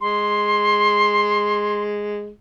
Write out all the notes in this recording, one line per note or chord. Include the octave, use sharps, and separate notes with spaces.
G#3 C6